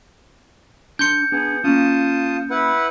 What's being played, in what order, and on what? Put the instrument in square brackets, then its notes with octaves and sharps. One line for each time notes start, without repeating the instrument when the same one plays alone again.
[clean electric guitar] D4 C6 [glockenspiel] G6 C#7
[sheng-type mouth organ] B3 G#4 [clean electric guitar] D4
[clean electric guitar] A#3 C#4 [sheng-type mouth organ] F4 A5 D#6
[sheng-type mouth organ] E4 B4 F#5